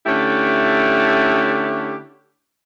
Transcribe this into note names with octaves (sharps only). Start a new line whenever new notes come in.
D3 A3 C#4 E4 G4